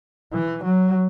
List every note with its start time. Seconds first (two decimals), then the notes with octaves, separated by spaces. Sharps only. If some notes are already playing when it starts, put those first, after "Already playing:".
0.33 E3
0.64 F#3